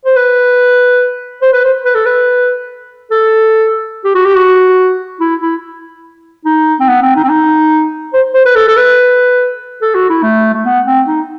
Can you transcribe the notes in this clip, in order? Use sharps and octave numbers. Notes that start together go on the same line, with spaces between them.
C5
B4
C5
B4
C5
B4
A4
B4
A4
G4
F#4
G4
F#4
E4
E4
D#4
C4
B3
C4
D#4
C4
D#4
C5
C5
B4
A4
A4
B4
A4
F#4
E4
A3
A3
B3
C4
D#4